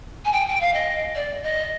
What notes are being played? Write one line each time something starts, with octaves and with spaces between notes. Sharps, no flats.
G#5
G5
G5
F5
D#5
D5
D#5